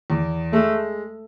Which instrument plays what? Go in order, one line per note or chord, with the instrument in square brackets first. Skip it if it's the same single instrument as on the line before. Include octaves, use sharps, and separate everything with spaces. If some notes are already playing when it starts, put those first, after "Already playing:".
[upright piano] E2
[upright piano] G#3 [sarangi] A3